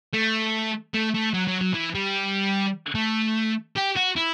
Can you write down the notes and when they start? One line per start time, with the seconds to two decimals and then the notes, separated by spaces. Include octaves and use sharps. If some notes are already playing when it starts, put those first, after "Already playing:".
0.13 A3
0.94 A3
1.14 A3
1.34 F#3
1.47 F#3
1.61 F#3
1.74 E3
1.95 G3
2.95 A3
3.76 G4
3.96 F#4
4.16 E4